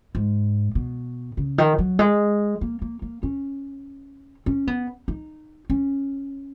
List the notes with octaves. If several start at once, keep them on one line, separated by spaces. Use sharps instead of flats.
G#2
B2
C#3
D#3
F#3
G#3
A#3
A#3
A#3
C#4
C#4
B3
D#4
C#4